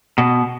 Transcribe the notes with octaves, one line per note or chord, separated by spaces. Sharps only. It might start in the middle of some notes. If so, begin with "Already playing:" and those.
B2